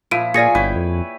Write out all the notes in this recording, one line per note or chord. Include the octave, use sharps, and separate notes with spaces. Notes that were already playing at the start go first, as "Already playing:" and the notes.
A#2 F3 E4 D7 D#7
A#2 F4 G#4 C#5 D5 G#5 A#6 C#7
G1 E4 B4 C#5 G5
F2